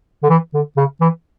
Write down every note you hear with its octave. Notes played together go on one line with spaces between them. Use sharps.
D3
E3
D3
C#3
E3